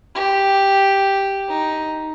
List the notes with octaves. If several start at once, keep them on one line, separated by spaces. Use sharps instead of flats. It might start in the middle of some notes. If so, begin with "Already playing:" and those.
G4
D#4